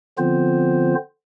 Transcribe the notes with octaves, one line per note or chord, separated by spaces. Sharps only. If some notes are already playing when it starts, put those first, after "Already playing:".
D3 F3 B3 C4 F4 C5